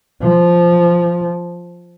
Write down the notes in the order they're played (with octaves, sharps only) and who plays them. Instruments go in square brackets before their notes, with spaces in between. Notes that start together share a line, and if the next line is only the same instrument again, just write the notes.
[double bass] F3